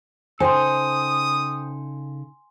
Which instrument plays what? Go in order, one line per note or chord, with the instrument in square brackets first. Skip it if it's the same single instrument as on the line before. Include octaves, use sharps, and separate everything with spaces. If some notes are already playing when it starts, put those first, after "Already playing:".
[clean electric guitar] C#3 D#4 A4 [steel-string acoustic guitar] C5 G5 [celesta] G#5 C6 [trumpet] D#6